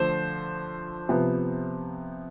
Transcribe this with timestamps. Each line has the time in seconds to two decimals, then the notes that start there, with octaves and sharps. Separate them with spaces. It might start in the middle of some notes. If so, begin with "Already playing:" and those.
Already playing: D3 F3 A3 C5
1.09 C3 F3 B3